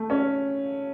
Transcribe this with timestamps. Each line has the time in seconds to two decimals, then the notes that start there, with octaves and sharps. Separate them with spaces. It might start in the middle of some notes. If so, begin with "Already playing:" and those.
Already playing: A3
0.10 C#4